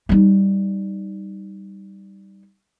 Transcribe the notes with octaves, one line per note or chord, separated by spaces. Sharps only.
G3 D#4